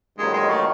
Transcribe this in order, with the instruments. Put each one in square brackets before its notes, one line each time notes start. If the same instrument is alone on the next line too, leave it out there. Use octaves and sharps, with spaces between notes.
[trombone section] A1 G2 D#3 F#3 A#3 [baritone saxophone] G#3
[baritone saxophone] G#3
A3